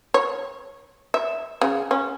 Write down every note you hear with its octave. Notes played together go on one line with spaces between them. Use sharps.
C#5
E5
C#3
C#4